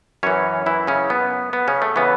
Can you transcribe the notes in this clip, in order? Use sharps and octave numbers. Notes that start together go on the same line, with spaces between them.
F#2 E3 C#4 C#5
E3 E4
C#3 C#4
B3
B3
C#3 C#4
A3
C#3 E3 B3